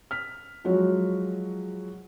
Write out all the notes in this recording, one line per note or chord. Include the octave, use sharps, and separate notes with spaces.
F6 B6
F3 F#3 G#3 F#4 C#5